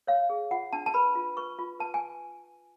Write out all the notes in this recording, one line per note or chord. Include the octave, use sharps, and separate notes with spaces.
C#5 F5
G#4
F4 F#5
D4 A5
A5
B4 B5
F4
B4 C#6
F4
B4 A5
G#5